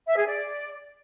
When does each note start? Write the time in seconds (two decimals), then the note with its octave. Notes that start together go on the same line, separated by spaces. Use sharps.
0.07 E5
0.17 G#4
0.27 D5